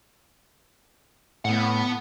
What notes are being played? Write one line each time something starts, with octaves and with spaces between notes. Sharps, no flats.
A2 B3 F#5